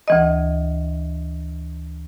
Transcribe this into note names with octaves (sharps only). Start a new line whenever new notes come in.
D2 E3 D#5